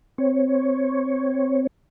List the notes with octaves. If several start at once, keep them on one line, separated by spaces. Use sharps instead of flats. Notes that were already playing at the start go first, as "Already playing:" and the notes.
C4 C#5